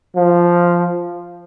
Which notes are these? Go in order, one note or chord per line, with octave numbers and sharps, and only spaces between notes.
F3